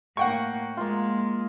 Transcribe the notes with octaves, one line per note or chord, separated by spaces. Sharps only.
A2 A#3 F#5 G5 C#6
G#3 A#3 F4